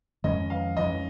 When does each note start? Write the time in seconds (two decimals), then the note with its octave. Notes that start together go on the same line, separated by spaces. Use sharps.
0.24 F2 D#3 G#3 C#4 D#5
0.50 F5
0.77 F2 D#3 G#3 C#4 D#5